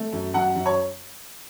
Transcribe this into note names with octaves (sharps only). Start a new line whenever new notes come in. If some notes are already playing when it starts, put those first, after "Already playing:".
Already playing: A3
F#2
F#2 F#5
F#2
C#5